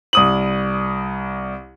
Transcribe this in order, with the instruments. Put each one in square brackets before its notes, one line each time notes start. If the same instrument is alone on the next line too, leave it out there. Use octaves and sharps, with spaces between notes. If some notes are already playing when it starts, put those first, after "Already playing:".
[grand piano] C2 D#6 F#7